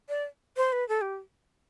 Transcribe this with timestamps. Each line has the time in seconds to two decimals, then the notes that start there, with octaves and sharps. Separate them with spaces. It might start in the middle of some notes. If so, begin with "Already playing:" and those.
0.09 D5
0.57 C5
0.72 B4
0.89 A4
1.01 G4